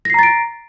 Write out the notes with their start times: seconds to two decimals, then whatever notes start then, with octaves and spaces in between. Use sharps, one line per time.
0.05 A#6
0.10 C7
0.14 A#5
0.19 A6
0.23 D7